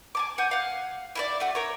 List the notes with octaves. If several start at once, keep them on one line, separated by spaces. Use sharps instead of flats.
G#5 A5 D6
F#5 G#5 G6
F5 F#5
E4 A4 D5
A3 F#4
A#4 C#5